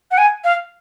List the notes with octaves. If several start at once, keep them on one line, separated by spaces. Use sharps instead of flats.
F#5
G#5
F5